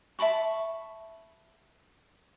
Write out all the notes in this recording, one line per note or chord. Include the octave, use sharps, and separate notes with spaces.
E5 A5 B5 C#6